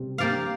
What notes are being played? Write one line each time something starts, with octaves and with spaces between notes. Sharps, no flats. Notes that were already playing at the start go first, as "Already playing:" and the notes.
Already playing: C3 G3
A#3 G4 D5 F5